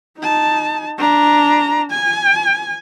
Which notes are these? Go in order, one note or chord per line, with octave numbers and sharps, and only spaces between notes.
D#4 A5
D4 A#5
G#5